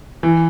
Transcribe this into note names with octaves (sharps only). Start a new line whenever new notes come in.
E3